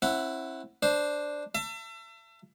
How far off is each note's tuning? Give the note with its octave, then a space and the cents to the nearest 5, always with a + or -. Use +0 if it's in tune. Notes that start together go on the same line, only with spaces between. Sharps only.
C4 +45 E4 +0 F#5 +0
D4 +0 C5 +0
E5 +35 A5 +35